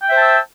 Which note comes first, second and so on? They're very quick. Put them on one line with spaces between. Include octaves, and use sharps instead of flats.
G5 E5 C5 A5 E6